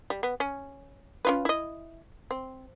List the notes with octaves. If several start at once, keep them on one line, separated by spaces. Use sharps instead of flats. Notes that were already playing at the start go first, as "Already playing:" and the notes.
G3
B3
C#4
C#4 F4 B4
E4 D#5
C4